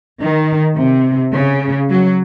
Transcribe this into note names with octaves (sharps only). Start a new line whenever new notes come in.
D#3
C3
C#3
F#3